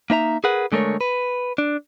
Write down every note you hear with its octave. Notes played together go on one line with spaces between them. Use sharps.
A#3 D#4 E5 A#5
G#4 A#4 B4 F#5
D3 G#3 A3 A#4 C#5
B4
D4